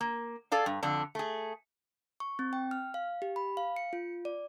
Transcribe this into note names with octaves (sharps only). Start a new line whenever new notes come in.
A#3
G#4 A4 D5 F5
G2
F2 D3 D4
A3 G#4
C#6
C4
G5
F6
F5
G4
B5
F5
C#7
F4
D5